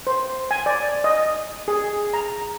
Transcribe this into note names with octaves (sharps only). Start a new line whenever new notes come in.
C5
G#5
D5
D#5
G#4
A#5